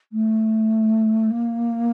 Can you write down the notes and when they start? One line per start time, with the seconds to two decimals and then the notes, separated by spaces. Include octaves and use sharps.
0.12 A3
1.30 A#3